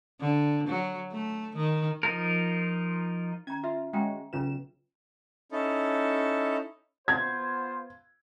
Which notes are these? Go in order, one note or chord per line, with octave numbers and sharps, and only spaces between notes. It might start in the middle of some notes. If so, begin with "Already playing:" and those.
D3
F#3
A3
D#3
F3 D#4 F4 A#4
C#4 A#5 G#6
F4 E5
G#3 C#4 F#4 G5 A#5
B1 C#3 C#4 F4 B4 E7
C#4 D#4 E4 A4
B3 F4 C5 G#6